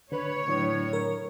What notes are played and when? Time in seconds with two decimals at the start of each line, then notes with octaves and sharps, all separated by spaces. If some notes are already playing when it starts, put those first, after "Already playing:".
0.12 D3 B4 C#5
0.48 A2 D3 F#3 D4
0.93 A#4